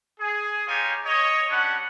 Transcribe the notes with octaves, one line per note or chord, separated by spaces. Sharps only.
G#4
G#3 D#4 F4 G4 C#5 G#5
C#5 D#5
G3 C#4 D4 F#5